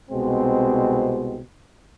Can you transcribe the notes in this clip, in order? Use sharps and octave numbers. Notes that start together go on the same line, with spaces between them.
C2 B2 G#3 C4